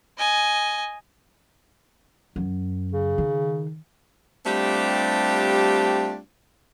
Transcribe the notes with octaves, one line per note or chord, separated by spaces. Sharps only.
D#5 G#5
F#2
C#3
D#3
G3 A3 C4 D4 F4 G4